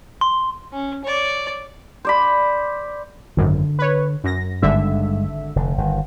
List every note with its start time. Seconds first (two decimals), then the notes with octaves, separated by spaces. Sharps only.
0.21 C6
0.72 C#4
1.04 C#5 D5
2.05 C5 D5 B5
3.37 G#1 F#2 D3
3.79 B4 C#5
4.24 F#2 A#6
4.62 G#1 G2 D3 G#3 E5
5.56 F1 D3
5.78 G1 D#3